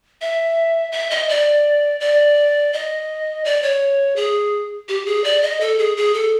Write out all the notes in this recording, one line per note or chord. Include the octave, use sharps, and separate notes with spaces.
E5
E5
D#5
D5
D5
D#5
D5
C#5
G#4
G4
G#4
D5
D#5
A4
G#4
G#4
A4